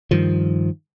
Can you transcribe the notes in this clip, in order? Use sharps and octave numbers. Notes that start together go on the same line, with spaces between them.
G2 D#3 F3